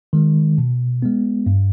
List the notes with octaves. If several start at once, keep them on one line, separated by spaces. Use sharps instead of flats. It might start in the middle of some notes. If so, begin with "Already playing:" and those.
D#3 G#3
B2
G#3 B3
G2